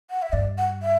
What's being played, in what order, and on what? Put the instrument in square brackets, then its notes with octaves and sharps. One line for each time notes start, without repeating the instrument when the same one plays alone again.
[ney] F#5
E5
[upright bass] G2 [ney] D5
[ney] F#5
E5